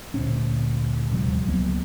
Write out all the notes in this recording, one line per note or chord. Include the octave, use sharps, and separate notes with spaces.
D2 A#2 C4 C#4
D#1 C3 F3 G3
C#2 F#3 A#3 B3